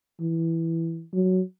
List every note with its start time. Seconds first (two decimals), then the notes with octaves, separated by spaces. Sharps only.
0.21 E3
1.13 F#3